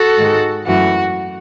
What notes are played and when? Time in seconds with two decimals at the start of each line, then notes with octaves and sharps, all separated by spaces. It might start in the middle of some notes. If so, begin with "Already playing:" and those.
Already playing: F#4 A4
0.17 G#2 D#3 G#3
0.66 F#2 E3 A3 F#4